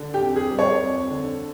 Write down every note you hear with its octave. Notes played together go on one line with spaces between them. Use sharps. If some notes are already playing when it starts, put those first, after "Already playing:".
Already playing: D3
G4
F2
G#4
G3
C#5
F2
D3